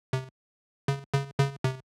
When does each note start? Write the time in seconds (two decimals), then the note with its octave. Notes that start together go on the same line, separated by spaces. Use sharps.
0.13 C3
0.88 C#3
1.14 C#3
1.40 C#3
1.64 C3